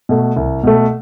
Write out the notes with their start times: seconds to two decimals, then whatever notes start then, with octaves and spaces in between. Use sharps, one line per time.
0.09 B2 A3
0.36 C2
0.63 B2 A3